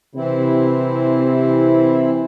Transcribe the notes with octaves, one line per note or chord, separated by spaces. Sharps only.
C3 E3 C4 E4